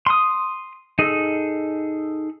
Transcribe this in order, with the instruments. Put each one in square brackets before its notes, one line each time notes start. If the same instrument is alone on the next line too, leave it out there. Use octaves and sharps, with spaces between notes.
[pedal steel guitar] C6 D#6
D#4 G#4 A4